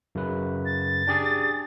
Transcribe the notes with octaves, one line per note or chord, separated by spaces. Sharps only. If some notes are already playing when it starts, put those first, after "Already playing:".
F#2 C#3 B4
A6
D4 G4 G#4